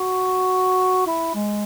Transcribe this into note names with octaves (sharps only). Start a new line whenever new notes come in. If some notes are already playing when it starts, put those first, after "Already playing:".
Already playing: F#4
E4
G#3